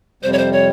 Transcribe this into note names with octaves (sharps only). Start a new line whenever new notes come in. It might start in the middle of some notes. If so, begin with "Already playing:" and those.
F2 C3 G3 C5
C#5
C5
C#5